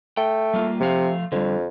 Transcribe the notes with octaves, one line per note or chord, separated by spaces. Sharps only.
A3 G5
G3 A#3 F4
C3 F3 A3 F5
F2 D3 G3